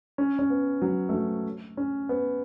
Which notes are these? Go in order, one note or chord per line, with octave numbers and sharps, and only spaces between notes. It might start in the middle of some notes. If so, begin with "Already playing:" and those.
C#4
C#4
B3
F#3
A3
F#3
C#4
B3